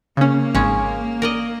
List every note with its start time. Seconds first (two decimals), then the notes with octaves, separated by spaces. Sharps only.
0.17 C#3 A#3 C#4
0.55 G#1 G#3 C#4
1.22 A#4 D5 D#5